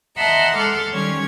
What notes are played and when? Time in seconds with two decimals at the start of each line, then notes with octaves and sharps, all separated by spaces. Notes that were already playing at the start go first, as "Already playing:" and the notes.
0.17 D#5 E5 F#5 A5 A#5 C6
0.57 G#3 A4 C6 D6 F6
0.91 D#3 G3 C#4 C#5 G#6